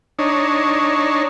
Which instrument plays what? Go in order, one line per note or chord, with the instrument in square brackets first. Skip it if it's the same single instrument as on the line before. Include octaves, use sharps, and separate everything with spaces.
[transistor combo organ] D4 D#4 C#5